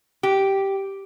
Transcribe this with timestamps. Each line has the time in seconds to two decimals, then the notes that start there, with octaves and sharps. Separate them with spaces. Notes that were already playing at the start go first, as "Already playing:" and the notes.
0.23 G4